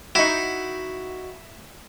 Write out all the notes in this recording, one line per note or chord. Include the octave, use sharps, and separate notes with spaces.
D#4 E4 F#4